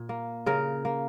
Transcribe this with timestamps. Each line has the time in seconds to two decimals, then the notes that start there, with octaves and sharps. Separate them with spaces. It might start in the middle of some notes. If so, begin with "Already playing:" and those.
Already playing: A#2
0.09 A#3
0.46 C#3 A#4
0.85 A#3